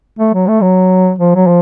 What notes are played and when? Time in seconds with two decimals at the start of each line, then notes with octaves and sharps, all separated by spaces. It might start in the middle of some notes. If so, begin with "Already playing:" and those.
0.19 A3
0.34 F#3
0.48 A3
0.61 F#3
1.19 F3
1.35 F#3
1.47 F3